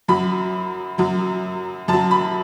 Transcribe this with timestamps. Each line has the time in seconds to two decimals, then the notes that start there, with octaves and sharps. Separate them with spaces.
0.08 F#2 F#3 B5
0.98 F#2 F#3
1.88 F#2 F#3 A5
2.11 B5